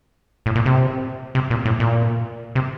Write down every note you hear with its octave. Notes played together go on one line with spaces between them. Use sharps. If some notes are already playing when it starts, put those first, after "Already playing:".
A2
A#2
C3
C3
A#2
A2
A#2
C3